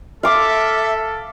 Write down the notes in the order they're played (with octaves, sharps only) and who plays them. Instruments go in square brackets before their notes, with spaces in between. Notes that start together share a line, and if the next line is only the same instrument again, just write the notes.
[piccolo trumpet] A4 [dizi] E5 [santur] F5 D6